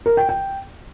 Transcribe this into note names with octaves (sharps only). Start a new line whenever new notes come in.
A#4
G5
G5